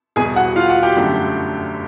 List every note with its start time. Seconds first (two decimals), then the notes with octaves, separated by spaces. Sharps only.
0.16 E2 B2 G3 G#4 G#5
0.36 F#4 F#5
0.56 F4 F5
0.69 F#4 F#5
0.83 G4 G5
0.96 G1 F#2 D3 F#3 A3